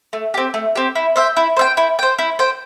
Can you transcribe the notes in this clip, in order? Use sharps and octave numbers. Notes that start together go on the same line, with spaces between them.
A3
C4 G4
A3
C4 G4
E4
C5 E5 G5
E4
C5 E5 G5
E4
C5 G5
E4
C5 G5